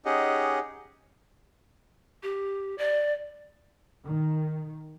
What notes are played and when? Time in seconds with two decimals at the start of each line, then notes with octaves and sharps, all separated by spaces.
0.05 C#4 D#4 G4 G#4 D#5 F#5
2.23 G4
2.78 D5
4.05 D#3